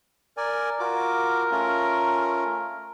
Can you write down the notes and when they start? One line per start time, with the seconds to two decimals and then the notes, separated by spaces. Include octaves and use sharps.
0.37 A#4 D5 G#5
0.80 F4 F#4 A#4 D6
1.51 A3 C#4 F4